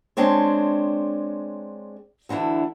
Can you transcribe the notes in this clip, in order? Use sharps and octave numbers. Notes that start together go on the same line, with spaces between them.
G#3 C4 D4 C#5
D2 D3 E3 E4